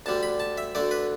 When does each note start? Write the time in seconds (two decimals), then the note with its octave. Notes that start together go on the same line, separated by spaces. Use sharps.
0.06 D2 D3 G3 A5
0.23 B5
0.40 A5
0.58 E5
0.75 D2 D3 A3 D5
0.91 B4